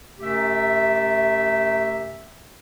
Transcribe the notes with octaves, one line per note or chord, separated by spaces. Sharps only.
F#2 C3 A3 G4 E5